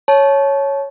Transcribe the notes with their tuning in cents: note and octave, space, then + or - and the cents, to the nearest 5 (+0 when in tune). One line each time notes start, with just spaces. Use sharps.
C#5 +0 A5 -25